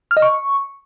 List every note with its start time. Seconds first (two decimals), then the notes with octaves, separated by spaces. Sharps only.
0.11 F6
0.17 D#5
0.22 C#6